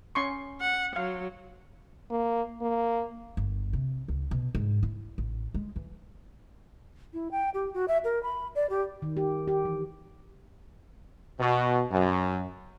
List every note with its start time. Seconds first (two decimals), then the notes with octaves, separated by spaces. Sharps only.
0.15 C#4 C6 C#6
0.61 F#5
0.96 F#3 F5
2.11 A#3
2.62 A#3
3.37 G1
3.73 C3
4.08 C#2
4.31 B2
4.55 G#2
4.83 E4
5.18 A1
5.54 G#3
5.76 E3
7.13 E4
7.31 G5
7.54 G4
7.74 F#4
7.88 E5
8.04 A#4
8.23 B5
8.55 D5
8.70 G4
9.02 D#3
9.17 G4
9.48 G4
9.65 E3
11.39 B2
11.91 F#2